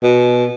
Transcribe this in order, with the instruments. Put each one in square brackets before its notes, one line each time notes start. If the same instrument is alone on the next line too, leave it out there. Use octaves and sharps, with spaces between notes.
[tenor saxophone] B2